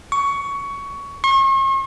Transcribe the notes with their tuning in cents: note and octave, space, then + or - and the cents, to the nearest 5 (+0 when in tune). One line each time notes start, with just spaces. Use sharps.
C#6 +15
C#6 -45